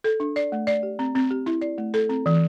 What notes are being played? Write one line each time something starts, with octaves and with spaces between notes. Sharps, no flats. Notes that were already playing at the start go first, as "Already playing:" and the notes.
A4
D4
D5
A3
D5
G4
C4
C4
G4
E4
D5
A3
A4
C4
E3